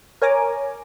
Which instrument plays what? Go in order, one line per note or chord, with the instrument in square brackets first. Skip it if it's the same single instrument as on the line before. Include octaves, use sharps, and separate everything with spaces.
[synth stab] A#4 C#5 G#5 A#5 D6